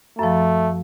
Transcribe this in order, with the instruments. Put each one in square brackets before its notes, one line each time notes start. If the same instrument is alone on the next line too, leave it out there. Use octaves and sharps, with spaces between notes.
[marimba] F#2 F3 [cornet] A3